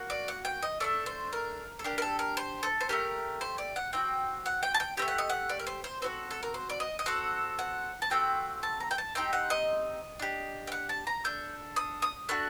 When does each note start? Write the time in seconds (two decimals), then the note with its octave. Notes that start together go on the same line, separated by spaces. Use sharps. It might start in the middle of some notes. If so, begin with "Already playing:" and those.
Already playing: A#3 F#4
0.10 D5
0.28 F#5
0.45 G5
0.63 D#5
0.80 A3 D4 A4 D5
1.06 C5
1.33 A#4
1.79 A4
1.84 D4 G4 A#4
1.98 A#4
2.02 A4
2.19 A#4
2.37 C5
2.63 A4
2.81 C5
2.89 A3 D4 G4 A#4
3.41 C5
3.58 D5
3.76 F#5
3.93 C4 D#4 F#4 G5
4.46 F#5
4.63 G5
4.74 A5
4.80 G5
4.97 C4 G4 G5
5.02 A3
5.08 F#5
5.18 D#5
5.30 F#5
5.49 D5
5.60 A#4
5.67 C5
5.84 C5
6.02 C4 F#4 A4 C5
6.31 A4
6.43 A#4
6.54 C5
6.70 D5
6.80 D#5
6.99 D#5
7.06 C4 F#4 A4 F#5
7.59 F#5
8.02 A5
8.10 A3 C4 F#4 G5
8.63 A5
8.80 A#5
8.91 G5
8.98 A5
9.15 C4 D#4 G4 G5
9.33 F#5
9.50 D#5
10.19 D4 G4
10.67 G5
10.72 F#5
10.89 A5
11.07 A#5
11.24 D4 A4 G6
11.76 D#6
12.02 D#6
12.29 A3 D4 F#4 F#6